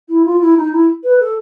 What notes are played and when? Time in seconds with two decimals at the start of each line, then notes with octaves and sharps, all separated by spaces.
0.08 E4
0.25 F4
0.40 E4
0.56 D#4
0.71 E4
1.03 B4
1.19 A4